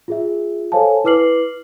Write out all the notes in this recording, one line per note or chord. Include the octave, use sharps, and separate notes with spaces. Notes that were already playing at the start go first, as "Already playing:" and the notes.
F4 G#4 E5
A4 C5 C#5 F5 G#5 A5
E4 B4 D6 F6 C7 F#7